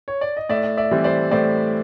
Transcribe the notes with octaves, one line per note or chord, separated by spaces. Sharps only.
C#5
D5
D#5
A2 D5 E5
D5 E5
E3 G3 C4
C5 D5
A2 C5 D5